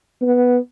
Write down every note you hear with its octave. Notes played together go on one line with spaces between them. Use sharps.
B3